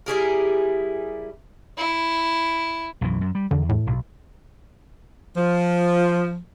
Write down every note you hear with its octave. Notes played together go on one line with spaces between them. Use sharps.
G3 E4 G#4 A#4
E4
B1 F#2 E3
F#2
G3
E2 D3
A2
B1
F3